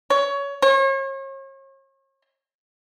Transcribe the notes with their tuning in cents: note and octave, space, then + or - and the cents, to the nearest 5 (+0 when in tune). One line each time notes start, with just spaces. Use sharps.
C#5 +20
C#5 -40